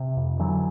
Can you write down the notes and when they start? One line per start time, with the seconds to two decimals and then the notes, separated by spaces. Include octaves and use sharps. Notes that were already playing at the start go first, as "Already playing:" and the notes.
Already playing: C3
0.17 F2
0.39 D3 E3 F#3